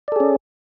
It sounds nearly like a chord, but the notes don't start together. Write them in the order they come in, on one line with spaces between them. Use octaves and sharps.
D5 A4 G#4 C#4